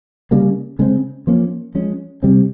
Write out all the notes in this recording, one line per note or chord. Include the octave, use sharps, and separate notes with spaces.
C#3 G3 A#3
C#3 G#3 C4
F3 A#3 C#4
F3 G#3 C#4
C3 G3 C4